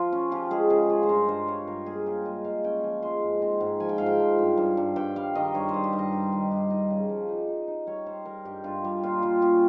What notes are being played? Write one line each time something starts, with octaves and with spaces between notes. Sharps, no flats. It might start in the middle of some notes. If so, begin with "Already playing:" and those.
Already playing: F3 F4
C#4
F3 G4
G#3 G#4
C#3 G#4
F4 G#4
C5
G2 A#4
G2 C5
F4 C#5
G2 A#4
A#3 G#4
F4 G4
G#3 D#5
G#3 F5
C#4 G5
F3 G#5
G#3 C6
G#2
C4
G#2
F3 G#5
G5
G#2 F5
G5
F3
G2
G2
G2
G2 G5
G3 F5
D#3 D#5
G2 C#5
C5
G2
G4
G2
D#5
G2
D#3
G2
D#4 D#5
C#3
F3
D#4
D#4
D#4
G3 C#5
G3 C5
G3 A#4
G2 G4
G2 F4
G3
A#2 F4
G3 F4
C#4 G4